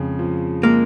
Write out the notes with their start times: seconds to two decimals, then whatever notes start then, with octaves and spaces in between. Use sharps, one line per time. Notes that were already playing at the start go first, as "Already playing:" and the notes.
Already playing: F2 C#3 G#3
0.19 F3
0.63 G#3 A#3